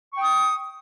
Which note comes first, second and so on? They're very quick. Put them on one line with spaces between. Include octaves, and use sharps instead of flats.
C#6 G5 D#6